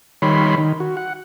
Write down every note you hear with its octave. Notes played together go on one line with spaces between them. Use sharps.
D#3 G3 C#5 B5 C6
D#3
F#4
F#5